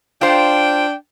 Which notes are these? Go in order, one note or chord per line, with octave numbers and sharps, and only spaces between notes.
D4 F4 C5 G5